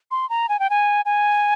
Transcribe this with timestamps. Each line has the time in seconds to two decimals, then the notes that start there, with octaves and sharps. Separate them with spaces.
0.11 C6
0.30 A#5
0.49 G#5
0.60 G5
0.70 G#5
1.05 G#5